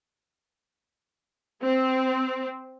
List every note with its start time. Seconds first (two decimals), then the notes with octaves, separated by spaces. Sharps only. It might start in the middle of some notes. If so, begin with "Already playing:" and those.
1.62 C4